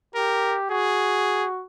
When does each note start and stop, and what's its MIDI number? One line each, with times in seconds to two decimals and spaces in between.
0.15 0.66 67
0.15 0.58 70
0.71 1.64 66
0.71 1.47 68